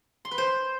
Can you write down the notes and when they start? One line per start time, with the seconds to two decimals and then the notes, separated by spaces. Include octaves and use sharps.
0.25 C6
0.31 B4
0.38 C5